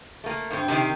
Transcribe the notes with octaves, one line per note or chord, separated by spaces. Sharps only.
A3 A#3
G2 C4
C3 D#3 C4